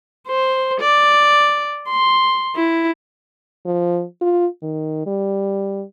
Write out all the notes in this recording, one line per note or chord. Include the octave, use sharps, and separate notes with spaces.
C5
D5
C6
E4
F3
F4
D#3
G3